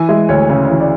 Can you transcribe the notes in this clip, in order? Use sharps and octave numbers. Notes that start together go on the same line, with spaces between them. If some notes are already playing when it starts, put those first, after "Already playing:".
Already playing: E3 G#5
G#3 E5
D2 C#5
C#3 C#5
E3 C#5
D5